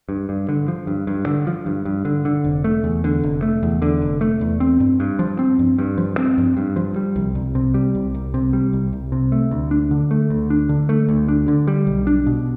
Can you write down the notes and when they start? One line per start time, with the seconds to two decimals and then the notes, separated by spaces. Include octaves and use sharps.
0.09 G2
0.29 G2
0.49 D3
0.68 F3
0.87 G2
1.07 G2
1.26 D3
1.47 F3
1.66 G2
1.85 G2
2.05 D3
2.25 D3
2.44 F1
2.64 A3
2.84 E2
3.04 D3
3.23 F1
3.42 A3
3.63 E2
3.82 D3
4.02 F1
4.21 A3
4.41 E2
4.60 C4
4.80 G2
5.00 G2
5.19 F3
5.39 C4
5.59 G2
5.78 G2
5.98 F3
6.18 C4
6.38 G2
6.57 G2
6.76 F3
6.96 G3
7.16 C2
7.35 C2
7.55 C3
7.74 G3
7.95 C2
8.14 C2
8.34 C3
8.53 G3
8.73 C2
8.93 C2
9.12 C3
9.32 A3
9.51 D2
9.71 D4
9.91 D3
10.11 A3
10.30 D2
10.50 D4
10.69 D3
10.89 A3
11.09 D2
11.28 D4
11.48 D3
11.67 G3
11.87 B1
12.07 D4
12.26 B2